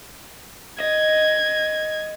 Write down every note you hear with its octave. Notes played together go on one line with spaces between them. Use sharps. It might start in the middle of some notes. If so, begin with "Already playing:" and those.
D#5 G#6